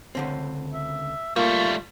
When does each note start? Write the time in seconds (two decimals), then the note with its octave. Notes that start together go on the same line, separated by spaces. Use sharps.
0.15 C#2 D3 C4
0.74 E5
1.36 G3 A3 A#3 F4 C#6